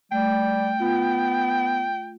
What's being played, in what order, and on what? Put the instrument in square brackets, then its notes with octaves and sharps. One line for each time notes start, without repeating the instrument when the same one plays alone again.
[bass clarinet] G3 [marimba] A3 [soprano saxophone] G5
[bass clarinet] B3 [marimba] F4